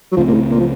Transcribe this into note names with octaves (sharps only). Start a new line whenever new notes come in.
F#3
C#2 C#3 F3 A3 C4
A#2
A2
A#2
F3